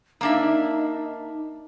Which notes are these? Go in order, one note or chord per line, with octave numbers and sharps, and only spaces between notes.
A#3 D4 D#4 E5